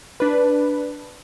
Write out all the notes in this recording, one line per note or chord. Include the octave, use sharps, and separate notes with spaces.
D4 B4